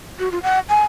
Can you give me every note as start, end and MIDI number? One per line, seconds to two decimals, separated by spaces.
0.19 0.32 66
0.32 0.39 65
0.43 0.59 78
0.69 0.83 80